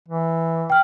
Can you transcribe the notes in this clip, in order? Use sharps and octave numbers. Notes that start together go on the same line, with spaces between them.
E3
G5 F6